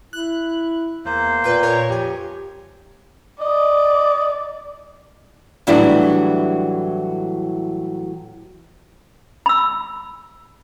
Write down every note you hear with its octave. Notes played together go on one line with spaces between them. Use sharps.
E4 F#6
E2 A#3 C5
A#2 B4 G5
A#4 C#5
F2 G4 G#5
D5 D#5
A2 E3 F#3 G3 D4 E4
B5 E6